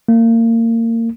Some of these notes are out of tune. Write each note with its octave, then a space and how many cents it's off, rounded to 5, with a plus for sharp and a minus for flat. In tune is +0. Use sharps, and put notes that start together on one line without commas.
A#3 -30